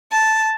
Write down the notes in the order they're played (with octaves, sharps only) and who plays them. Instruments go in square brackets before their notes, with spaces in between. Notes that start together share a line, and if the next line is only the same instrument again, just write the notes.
[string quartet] A5